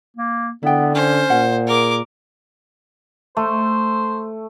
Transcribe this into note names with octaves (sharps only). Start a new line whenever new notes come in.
A#3
D3 B3 E4 G5
C#4 C5
A#2 F#5
G#4 A#4 D6
A3 C5